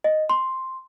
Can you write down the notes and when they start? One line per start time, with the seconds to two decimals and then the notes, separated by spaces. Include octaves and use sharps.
0.04 D#5
0.30 C6